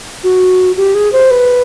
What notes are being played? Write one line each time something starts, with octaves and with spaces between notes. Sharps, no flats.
F#4
G4
G#4
C5
B4